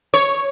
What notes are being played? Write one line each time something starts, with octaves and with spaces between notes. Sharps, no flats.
C#5